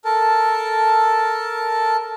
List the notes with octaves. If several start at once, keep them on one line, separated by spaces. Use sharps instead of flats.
A4 A#4 A5